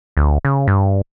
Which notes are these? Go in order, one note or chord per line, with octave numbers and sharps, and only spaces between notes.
D2
C#3
G2